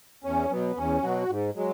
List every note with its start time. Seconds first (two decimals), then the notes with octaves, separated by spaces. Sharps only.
0.24 E2 C#4
0.51 B2 F#3 B3
0.77 E2 C#4
1.03 B2 F#3 F#4
1.30 G#2
1.56 F#3 G#3